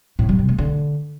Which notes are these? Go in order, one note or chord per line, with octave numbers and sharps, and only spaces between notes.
A2
G3
C3
A3
D3